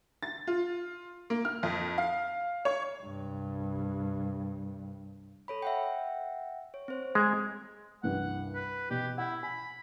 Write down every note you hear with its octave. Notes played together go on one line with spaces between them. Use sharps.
A6
F4
A#3
F6
F2
F5
C#5
C2 G2
A4 C#5 B5
E5 F#5 G5
C#5
C4 C5
G#3 G#5 F#6 G#6
C2 G2 F#5
B4
B2 G4
E4 F#5
G#5 B5